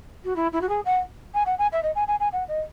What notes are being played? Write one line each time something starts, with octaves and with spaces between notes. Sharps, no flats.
F#4
E4
E4
F#4
G#4
F#5
G#5
F#5
G#5
E5
D#5
G#5
G#5
G#5
F#5
D#5